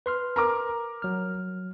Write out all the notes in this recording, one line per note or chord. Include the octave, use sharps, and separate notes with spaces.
B4 C6 F6
A#4 A#5 D6
F#3 F6